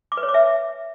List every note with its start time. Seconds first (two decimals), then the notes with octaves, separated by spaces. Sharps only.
0.12 D6
0.17 B4
0.23 C#5
0.29 D6
0.34 E5